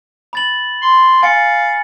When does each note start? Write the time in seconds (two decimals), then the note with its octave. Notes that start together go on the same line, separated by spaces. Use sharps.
0.33 B5 A6 F#7
0.82 C6
1.22 F5 G#5 A6 C#7